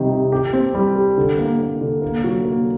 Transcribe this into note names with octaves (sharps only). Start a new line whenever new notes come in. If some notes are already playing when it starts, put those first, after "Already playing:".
Already playing: C3 D#3 G3
C3
G4
C4
G3
G4
D3
A#3
A#3
D3
A#3
F#3
A#3